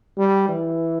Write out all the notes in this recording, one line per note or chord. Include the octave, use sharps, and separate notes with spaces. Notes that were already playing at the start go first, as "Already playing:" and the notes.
G3
E3